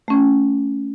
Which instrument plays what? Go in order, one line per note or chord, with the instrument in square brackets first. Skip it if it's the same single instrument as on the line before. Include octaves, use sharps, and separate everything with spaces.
[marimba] A3 C#4